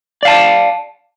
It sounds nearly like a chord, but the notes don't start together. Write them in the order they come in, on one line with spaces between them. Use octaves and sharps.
D5 F5 A5